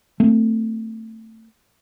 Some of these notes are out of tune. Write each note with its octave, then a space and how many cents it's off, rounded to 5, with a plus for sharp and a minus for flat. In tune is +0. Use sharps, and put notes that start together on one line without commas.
A3 +25 C4 +0